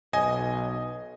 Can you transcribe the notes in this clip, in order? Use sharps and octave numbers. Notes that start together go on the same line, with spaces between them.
B1 D#5 G#5